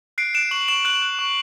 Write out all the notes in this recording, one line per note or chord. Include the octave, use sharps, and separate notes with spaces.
F#6 C7 D7
F#6 D7 E7
C#6 E7 F#7
C#6 E7 F#7
F#6 E7 F#7
F#6
C#6